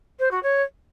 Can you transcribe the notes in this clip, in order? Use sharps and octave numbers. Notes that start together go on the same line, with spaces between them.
C5
F#4
C#5